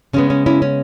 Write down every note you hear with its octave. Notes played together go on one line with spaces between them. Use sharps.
C#3 G#3 B3 C#4
C#4
C#4 E4
C#4